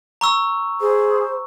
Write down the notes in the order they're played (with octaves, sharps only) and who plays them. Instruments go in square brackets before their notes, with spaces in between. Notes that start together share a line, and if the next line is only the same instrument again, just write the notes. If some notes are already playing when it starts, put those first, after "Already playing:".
[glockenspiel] A#5 C#6 E6
[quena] G#4 [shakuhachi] C5